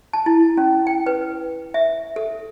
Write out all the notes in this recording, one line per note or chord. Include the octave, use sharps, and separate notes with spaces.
A5
E4
C#4
G5
B4
E5
A4